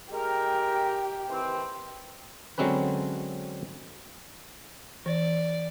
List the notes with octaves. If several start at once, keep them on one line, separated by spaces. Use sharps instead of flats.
G#3 G4 A#4 G5
D#3 E3 C4
D3 F#3 G#3 C4 C#4 B4
E3 D5